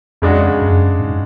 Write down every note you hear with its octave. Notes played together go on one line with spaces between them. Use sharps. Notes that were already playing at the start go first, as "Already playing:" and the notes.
F2 C#3 G#3 D4 F#4
F#2
G#2